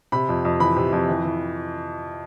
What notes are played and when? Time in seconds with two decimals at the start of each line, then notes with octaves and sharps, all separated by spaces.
0.12 C3 B5
0.29 F2
0.45 F2
0.60 E3 B5
0.76 C3
0.93 F2
1.09 E3
1.25 E3